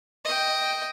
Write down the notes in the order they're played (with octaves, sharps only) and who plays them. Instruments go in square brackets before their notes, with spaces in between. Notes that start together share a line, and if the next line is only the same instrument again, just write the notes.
[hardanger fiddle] D#5 G5